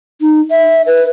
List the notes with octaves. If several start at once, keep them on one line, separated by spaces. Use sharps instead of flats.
D#4
E5
B4